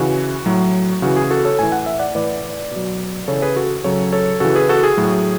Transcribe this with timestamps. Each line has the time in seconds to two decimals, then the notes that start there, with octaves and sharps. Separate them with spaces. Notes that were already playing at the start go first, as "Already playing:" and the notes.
Already playing: C#3 E3 F#4
0.46 A2 F#3
1.02 C#3 E3 F#4
1.16 G#4
1.31 F#4 A4
1.45 A4 C#5
1.59 A2 E3 G#5
1.72 F#5
1.86 E5
1.99 D5 F#5
2.15 A2 E3 B4 D5
2.71 B2 F#3
3.28 C#3 E3 A4 C#5
3.42 G#4 B4
3.56 F#4 A4
3.84 C#3 F#3 A4 C#5
4.13 A4 C#5
4.40 C#3 E3 F#4 A4
4.55 G#4 B4
4.69 F#4 A4
4.83 G#4
4.97 A2 F#3